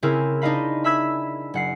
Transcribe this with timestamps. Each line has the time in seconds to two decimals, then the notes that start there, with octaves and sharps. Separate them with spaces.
0.03 C#3 C4 E4 G#4 A#4
0.42 D4 D#4 C5 D#5 F5 B5
0.84 E5 B5 E6 G#6 B6
1.54 F#1 F#5 C7